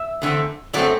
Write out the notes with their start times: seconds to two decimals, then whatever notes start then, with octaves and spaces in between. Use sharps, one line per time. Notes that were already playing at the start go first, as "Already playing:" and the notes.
Already playing: E5
0.22 E2 D3 A3 C4
0.73 F#2 F#3 A3 C4 D5